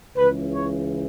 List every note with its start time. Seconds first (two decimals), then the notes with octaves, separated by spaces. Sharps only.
0.17 C#2 C#3 E3 B4
0.55 C#5